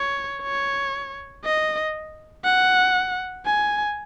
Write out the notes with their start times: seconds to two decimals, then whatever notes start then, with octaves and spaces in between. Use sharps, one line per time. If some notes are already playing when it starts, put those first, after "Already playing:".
Already playing: C#5
0.43 C#5
1.45 D#5
2.45 F#5
3.46 G#5